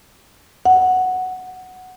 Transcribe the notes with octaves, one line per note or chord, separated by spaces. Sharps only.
F#5